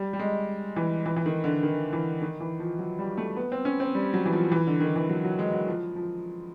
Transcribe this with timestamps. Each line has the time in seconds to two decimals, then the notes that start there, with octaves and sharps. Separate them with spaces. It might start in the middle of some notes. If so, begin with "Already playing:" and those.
Already playing: G3
0.13 G3
0.19 G#3
0.76 E3
1.06 E3
1.16 E3
1.26 D#3
1.44 D3
1.63 D#3
1.93 E3
2.22 D#3
2.40 E3
2.60 F3
2.79 F#3
2.99 G3
3.18 A3
3.37 B3
3.52 C4
3.65 C#4
3.80 C4
3.95 G3
4.14 F#3
4.26 E3
4.33 F3
4.52 E3
4.67 D3
4.80 D#3
4.96 E3
5.09 F#3
5.25 F#3
5.39 G#3
5.53 F#3
5.68 F3
5.96 F3